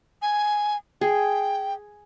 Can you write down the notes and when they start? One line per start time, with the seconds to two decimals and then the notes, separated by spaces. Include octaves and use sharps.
0.22 G#5
1.01 G#4 G5